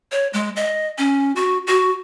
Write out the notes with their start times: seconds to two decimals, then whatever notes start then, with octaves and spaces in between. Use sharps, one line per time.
0.12 C#5
0.33 G#3
0.56 D#5
0.98 C#4
1.36 F#4
1.67 F#4